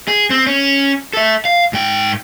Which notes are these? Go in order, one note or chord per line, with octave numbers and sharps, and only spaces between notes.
G#4
C4
C#4
A4 E5
F5
G#2 G5